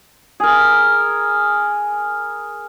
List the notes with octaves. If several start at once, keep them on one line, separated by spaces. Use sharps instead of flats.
G#4 A#4